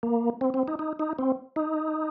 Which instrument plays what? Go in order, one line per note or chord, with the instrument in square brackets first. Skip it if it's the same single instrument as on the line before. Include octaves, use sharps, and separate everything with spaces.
[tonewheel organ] A#3
C4
C4
D#4
D#4
D#4
C4
D#4